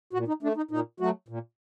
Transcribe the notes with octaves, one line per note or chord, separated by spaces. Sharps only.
A#2 F#4
D#4
A3 D4
D#4
A#2 D#4
F#3 A3 F#4
A#2